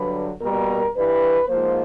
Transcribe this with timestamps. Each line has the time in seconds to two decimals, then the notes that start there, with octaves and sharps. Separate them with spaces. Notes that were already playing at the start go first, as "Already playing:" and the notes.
Already playing: G2 D3 F#3 B4
0.41 B2 G3 A#3 A#4
0.95 G2 E3 G3 B4
1.48 G#2 F3 A#3 C5